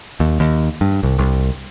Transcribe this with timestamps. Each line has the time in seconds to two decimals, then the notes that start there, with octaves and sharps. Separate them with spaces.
0.20 D#2
0.40 D#2
0.81 G2
1.03 C2
1.18 C2